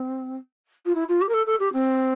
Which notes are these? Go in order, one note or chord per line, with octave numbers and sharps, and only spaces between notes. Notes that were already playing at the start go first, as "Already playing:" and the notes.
Already playing: C4
F4
E4
F4
G4
A#4
A4
A4
G4
C4